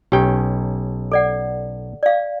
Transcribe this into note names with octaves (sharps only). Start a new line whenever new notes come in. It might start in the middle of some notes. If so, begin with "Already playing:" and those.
B1 C#4 G4 G5
A4 D5 F#5
D5 F5